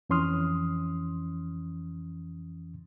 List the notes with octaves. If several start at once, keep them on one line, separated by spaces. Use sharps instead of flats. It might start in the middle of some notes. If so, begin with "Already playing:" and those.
F2 E3 C#4 C6 D#6 F6